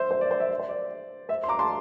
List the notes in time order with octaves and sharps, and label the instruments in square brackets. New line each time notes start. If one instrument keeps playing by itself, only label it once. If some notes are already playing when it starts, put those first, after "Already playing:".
Already playing: [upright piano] C5 E5
C5
D5
C5
E5
D5
C5
D5
C5 E5
C6
A#5 D6
A5 C6